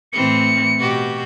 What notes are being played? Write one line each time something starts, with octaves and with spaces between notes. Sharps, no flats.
A2 E3 C4 C#7
B2 F#4 G4